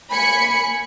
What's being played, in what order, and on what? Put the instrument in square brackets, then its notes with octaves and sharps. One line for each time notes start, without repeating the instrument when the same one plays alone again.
[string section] A#3 G#5 B5 C#7